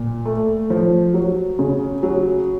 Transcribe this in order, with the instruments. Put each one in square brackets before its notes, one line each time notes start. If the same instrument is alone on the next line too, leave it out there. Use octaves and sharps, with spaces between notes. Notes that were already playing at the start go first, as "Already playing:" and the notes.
Already playing: [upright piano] A#2
A3
F3
F#3
C#3
F#3